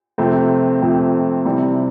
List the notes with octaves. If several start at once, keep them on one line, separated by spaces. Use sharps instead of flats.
F2 C3 F3 A3 C4
F2 C3 F3 A3 C4
C3 E3 G3 C4